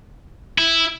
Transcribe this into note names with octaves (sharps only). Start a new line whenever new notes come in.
E4